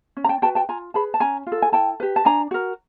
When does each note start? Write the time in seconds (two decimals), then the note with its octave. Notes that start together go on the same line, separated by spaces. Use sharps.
0.17 C#4
0.24 A#5
0.29 G5 A5
0.42 F#4 B4 G5 A5
0.55 G5 A5
0.69 F4 G#5 A#5
0.94 G#4 B4 A5 B5
1.14 A5
1.20 C#4 G#5 A#5
1.47 F4
1.52 A4
1.62 G#5
1.72 E4 G5 A5
2.00 G4 B4
2.16 A5
2.25 D4 G#5 A#5
2.51 F#4 A#4